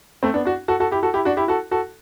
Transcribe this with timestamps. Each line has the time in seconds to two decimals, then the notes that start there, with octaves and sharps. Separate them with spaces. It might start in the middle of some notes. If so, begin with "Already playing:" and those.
0.23 A3 C4
0.34 B3 D4
0.45 D4 F#4
0.68 F#4 A4
0.80 F#4 A4
0.91 E4 G4
1.03 F#4 A4
1.14 E4 G4
1.25 D4 F#4
1.37 E4 G4
1.48 F#4 A4
1.71 F#4 A4